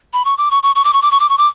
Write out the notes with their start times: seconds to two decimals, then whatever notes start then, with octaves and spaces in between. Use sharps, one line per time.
0.13 B5
0.25 C#6
0.38 D6
0.51 C#6
0.63 C#6
0.75 C#6
0.84 D6
0.93 C#6
1.02 D6
1.11 C#6
1.20 D6
1.29 C#6
1.38 D6